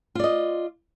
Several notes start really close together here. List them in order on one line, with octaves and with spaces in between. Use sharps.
F4 D5 D#5